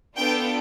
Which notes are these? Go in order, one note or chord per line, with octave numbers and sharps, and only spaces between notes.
B3 D4 F4 A4 G5